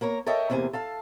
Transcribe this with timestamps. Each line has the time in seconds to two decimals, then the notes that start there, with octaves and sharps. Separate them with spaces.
0.01 A#3 A#4 C#5 A#5
0.26 A4 A#4 C#5 D#5 E5 G5
0.50 E2 C3 A#3 C5 G#5
0.73 A4 F5 A5